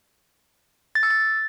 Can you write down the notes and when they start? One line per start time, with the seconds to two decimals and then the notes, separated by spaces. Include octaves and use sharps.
0.95 A6
1.03 E6
1.11 A6